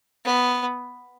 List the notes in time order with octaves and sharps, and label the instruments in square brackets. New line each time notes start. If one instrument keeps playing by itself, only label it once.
[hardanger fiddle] B3